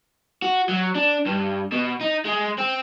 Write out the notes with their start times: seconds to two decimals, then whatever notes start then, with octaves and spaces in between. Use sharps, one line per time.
0.42 F#4
0.69 F#3
0.95 D4
1.27 G2
1.72 B2
2.01 D#4
2.25 G#3
2.58 C4